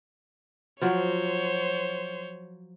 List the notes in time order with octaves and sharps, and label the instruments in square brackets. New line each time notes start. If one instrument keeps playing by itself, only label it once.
[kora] F3 F#3 F#4 [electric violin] C5 C#5